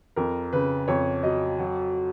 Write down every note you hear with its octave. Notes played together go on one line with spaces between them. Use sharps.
F2 A#4
C#3 B4
F2 C#5
F#3 D#5
F#3 F#4